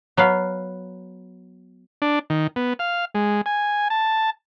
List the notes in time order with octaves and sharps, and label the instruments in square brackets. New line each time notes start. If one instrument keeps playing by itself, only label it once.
[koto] F#3 B3 F5
[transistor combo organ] D4
D#3
B3
F5
G#3
G#5
A5